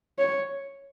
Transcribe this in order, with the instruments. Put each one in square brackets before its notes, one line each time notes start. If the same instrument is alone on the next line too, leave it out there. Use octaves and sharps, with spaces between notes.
[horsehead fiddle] C#5